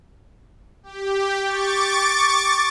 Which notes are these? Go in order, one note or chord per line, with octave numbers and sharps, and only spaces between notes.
G4
C#6 D6 A6